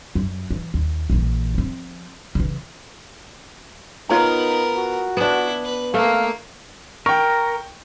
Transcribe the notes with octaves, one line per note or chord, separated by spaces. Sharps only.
F#2
E3
D#2
A#1 E3
F3 C4
C#3 E3
B3 D#4 F4 A#4 C#5 A#5
F#4
B3 D4 E4
B4
A3 A#3 F5
A#4 G5 C#6